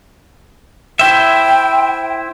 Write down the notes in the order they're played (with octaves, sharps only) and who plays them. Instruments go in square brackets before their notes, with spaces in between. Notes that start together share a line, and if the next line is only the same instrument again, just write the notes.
[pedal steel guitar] E4 C5 E5 [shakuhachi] G5